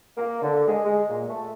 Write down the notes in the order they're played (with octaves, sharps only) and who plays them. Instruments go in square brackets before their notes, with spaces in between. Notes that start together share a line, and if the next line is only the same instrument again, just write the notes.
[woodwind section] A#3
D3
G#3
G#3
A#2
A3